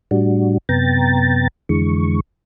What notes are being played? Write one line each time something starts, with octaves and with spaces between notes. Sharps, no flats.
A2 G3 D4 F#4
F#2 C3 B3 G5 A#5 A6
F2 D3 E3 G#3 C#6